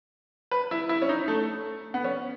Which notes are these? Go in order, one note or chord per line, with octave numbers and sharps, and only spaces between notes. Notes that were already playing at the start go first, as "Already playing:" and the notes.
B4
E4
E4
C#4
D#4
A3
B3
C#4